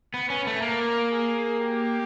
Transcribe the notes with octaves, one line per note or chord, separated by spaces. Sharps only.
B3 B4
C#4
A3
A#3 A#4
G#4
G4